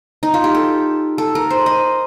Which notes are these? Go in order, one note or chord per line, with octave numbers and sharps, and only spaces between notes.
D#4
F4
G4
A4
A4
A#4
C5
D#5